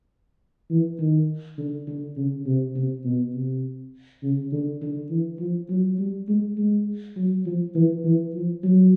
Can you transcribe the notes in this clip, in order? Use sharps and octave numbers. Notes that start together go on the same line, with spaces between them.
E3
D#3
D3
D3
C#3
C3
C3
B2
C3
C#3
D3
D3
E3
F3
F#3
G3
G#3
G#3
F#3
F3
E3
E3
F3
F#3